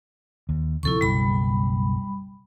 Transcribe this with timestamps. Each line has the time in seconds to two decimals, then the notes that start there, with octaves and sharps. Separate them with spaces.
0.49 D#2
0.83 D2 C3 F3 E4 A4 C#6
1.01 F#1 B1 G3 B5